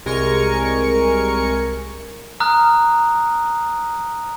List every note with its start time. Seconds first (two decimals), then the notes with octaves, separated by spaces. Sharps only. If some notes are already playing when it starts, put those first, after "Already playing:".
0.05 C2 G#3 A#4 G#5 C#6 C#7
2.40 A#5 D#6 F6 F#6